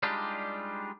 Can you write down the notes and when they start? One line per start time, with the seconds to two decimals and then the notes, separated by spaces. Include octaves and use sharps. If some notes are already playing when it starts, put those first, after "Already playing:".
0.03 G3 G#3 D4 D#4 F4 G4